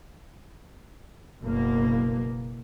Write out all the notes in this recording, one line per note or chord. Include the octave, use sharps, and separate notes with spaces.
F#1 B2 A#3